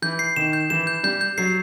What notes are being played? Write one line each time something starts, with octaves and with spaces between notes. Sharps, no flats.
E3 G6
C7
D#3 E7
G6
E3 E7
G6
G3 G6
G6
F#3 C7